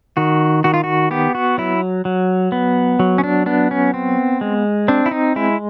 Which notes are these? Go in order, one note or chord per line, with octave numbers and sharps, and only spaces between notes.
D#3 F#4
D#3 F#4
F4
F#4
B3 G4
F#4
F#3 E4
F#3
B3
F#3
C#4
D4
B3 D4
C#4
C4
G#3
C4 D4
E4
D#4
G#3 E4